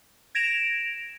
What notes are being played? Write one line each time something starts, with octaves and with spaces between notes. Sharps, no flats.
G#6 A#6 D7 E7 F7